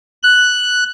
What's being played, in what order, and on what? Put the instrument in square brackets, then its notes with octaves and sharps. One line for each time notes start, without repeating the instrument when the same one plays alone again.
[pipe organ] F#6